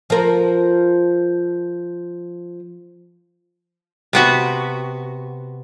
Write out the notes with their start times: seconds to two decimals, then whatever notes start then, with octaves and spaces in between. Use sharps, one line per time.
0.10 F3 A#4
4.13 C3 B3 F#4